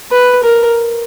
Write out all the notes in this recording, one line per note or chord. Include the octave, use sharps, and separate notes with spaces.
B4
A#4